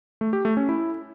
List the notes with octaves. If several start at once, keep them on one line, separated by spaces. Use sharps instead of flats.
A3
G4
A3
C#4
E4